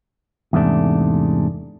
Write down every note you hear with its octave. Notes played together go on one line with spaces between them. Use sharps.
E2 G#2 C3 A3 D4